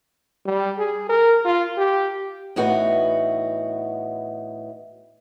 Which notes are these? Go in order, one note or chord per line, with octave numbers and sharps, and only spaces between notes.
G3
G#4
A#4
F4
G4
A2 E3 B3 D#4 F#4